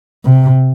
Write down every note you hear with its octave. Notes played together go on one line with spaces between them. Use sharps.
C3